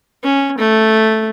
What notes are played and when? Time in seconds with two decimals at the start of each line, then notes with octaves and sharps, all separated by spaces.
0.23 C#4
0.58 A3